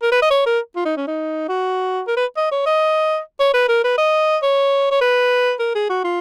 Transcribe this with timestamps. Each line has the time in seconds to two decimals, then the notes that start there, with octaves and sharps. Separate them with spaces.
0.02 A#4
0.12 B4
0.22 D#5
0.31 C#5
0.46 A#4
0.76 F4
0.85 D#4
0.96 C#4
1.07 D#4
1.48 F#4
2.07 A#4
2.17 B4
2.37 D#5
2.51 C#5
2.66 D#5
3.40 C#5
3.54 B4
3.68 A#4
3.84 B4
3.98 D#5
4.42 C#5
4.91 C#5
5.01 B4
5.59 A#4
5.75 G#4
5.90 F#4
6.04 F4